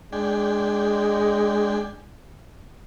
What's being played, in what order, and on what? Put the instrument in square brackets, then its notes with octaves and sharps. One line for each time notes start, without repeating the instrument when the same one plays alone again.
[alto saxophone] G#3 [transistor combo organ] D4 G5 G#5